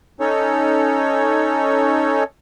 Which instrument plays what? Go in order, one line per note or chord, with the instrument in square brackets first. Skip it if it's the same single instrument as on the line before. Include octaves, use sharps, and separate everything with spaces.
[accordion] C#4 D#4 A4 C#5